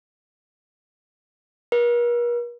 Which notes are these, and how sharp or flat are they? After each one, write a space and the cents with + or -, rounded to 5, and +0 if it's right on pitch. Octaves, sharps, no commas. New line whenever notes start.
A#4 +45